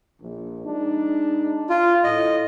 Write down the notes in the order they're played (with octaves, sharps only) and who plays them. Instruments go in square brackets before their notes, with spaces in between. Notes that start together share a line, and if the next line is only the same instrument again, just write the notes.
[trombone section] A#1
G#3 D4 D#4
[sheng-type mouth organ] F4
[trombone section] A2 [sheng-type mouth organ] D#5